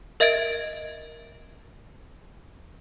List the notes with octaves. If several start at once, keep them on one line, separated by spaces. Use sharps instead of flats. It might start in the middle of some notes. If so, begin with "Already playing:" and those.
A#4 D#5 E5 G#6 A6 D7